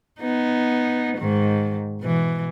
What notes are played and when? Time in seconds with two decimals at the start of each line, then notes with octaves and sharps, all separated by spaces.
0.20 B3 D#4
1.18 G#2 D#3
2.00 B2 E3